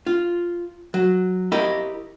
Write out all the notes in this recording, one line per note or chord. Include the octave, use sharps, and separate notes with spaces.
F4
F#3
E4 G4 A#4 D#5